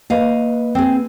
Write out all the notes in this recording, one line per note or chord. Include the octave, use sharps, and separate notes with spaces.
A#3 B4 D#5 F5
C4 G#4